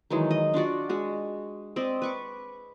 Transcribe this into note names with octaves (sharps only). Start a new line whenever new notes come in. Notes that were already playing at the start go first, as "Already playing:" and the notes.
D#3 E3 F#3 G#3
D#5
D4 F4 F#4 D5
G#3 F#4
C4 D5 D#5 B5
B4 C#6 D6